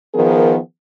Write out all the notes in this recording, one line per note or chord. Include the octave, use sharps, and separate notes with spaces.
D#3 F3 B3 G#4 A#4